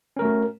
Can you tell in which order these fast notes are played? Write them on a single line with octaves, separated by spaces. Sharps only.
C#4 A#4 A3 F#4